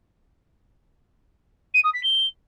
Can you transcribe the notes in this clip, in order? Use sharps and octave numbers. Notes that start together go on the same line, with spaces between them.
D#7
D#6
B6
G7